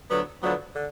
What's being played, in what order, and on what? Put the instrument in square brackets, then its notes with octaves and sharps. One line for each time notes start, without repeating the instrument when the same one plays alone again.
[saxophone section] D2 D3 F3 B3 [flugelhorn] F#3
[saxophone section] D2 D3 F3 B3 [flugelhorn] F#3
[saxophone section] D3